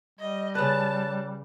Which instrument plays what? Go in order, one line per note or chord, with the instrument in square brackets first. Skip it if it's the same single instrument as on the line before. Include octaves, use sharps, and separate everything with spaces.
[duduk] G3 [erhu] D#5
[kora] C#3 B4 [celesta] C#5 F#6 [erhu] A5